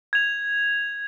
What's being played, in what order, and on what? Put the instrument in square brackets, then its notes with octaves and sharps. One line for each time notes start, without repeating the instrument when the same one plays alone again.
[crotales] G#6 F7